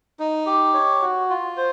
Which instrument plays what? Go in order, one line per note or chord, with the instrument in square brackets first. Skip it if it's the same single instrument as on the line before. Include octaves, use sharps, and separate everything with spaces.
[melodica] D#4
G4
C#5
F#4
F4
C5